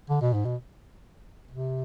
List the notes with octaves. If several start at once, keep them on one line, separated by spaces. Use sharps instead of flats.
D3
B2
G#2
B2
C3